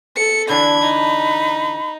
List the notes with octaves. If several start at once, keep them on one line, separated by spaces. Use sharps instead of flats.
A4 C#7
D3 E3 D4 B5 G#6
D#4